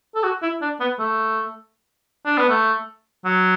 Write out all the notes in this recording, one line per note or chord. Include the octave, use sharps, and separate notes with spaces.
A4
F#4
E4
D4
B3
A3
D4
B3
A3
F#3